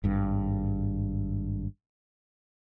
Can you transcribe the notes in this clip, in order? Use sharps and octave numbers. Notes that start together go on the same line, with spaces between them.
G#1 G2